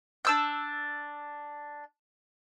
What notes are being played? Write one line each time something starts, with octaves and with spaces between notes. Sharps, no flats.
D4 E6 G6